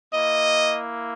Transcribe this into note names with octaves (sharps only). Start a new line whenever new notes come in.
A#3 E4 D#5